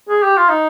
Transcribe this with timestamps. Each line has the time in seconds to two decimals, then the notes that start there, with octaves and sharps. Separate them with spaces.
0.09 G#4
0.23 G4
0.37 F4
0.49 D#4